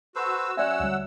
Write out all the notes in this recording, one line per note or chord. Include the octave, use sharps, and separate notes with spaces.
F#4 A4 B4 C5 E6
F#3 C#4 D5 E5 F#5 G#5 E6
D2 G3